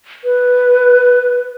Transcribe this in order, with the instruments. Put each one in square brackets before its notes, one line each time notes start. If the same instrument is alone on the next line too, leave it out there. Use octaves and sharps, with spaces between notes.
[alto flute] B4